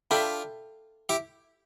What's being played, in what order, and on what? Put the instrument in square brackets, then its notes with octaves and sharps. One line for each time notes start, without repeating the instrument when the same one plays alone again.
[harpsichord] D4 F4 [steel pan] A4 E5 G5 B5
[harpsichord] E4 G4